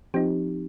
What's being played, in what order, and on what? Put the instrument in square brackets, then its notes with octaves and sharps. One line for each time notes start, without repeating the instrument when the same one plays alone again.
[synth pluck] F3 C4 D#4 G4